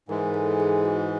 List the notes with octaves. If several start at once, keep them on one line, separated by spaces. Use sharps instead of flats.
G#2 E3 G#3 A#4
A4
G#4
F#4